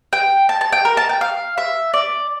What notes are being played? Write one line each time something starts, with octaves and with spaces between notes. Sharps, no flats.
G5
A5
A5
G5
A#4
A5
G5
F5
E5
D5